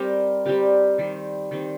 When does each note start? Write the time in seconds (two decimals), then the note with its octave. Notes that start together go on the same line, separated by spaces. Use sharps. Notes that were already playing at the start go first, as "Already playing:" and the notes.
Already playing: G3 C4 G4 A#4
0.46 G3 C4 G4 A#4
0.98 D#3 G3 C4
1.51 D#3 G3 C4